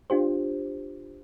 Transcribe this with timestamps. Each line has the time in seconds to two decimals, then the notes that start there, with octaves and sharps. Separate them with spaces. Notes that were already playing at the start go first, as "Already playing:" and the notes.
0.10 D4 F4 G4 C5